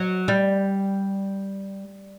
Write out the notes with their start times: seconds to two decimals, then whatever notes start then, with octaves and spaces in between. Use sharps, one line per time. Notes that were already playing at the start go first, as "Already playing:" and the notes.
Already playing: F#3
0.28 G3